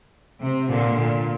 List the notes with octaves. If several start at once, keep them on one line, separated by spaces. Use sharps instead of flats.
C3
A#2 D3
A#2